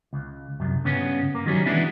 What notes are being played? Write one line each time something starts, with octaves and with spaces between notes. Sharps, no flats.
C#2
C2 F#2
G2 C#3 B3 C#4
A#3
D#3 F#3 G3 C#4
E3 G#3 B3 C#4 D4 E4